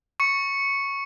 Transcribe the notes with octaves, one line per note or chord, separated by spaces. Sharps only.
C#6 C#7